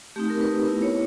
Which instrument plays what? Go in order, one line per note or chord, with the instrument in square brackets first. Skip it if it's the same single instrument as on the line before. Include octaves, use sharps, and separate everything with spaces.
[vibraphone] A3 C4 D#4 G4
A#4
B4
B3 E4
C#5